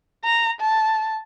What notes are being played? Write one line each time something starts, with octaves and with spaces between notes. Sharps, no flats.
A#5
A5